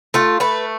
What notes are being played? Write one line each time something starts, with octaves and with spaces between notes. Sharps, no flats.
A3 F4
A3 B4